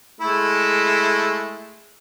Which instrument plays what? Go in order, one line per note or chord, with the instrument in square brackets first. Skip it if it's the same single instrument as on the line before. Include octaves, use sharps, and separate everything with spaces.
[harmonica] G#3 A3 E4